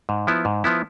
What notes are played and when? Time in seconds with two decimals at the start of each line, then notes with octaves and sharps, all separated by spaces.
0.09 G#2
0.27 F3 B3 E4
0.45 G#2
0.64 F3 B3 E4